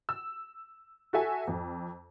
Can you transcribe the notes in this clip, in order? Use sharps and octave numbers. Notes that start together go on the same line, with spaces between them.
E6
F#4 A4 E5 G#5
F2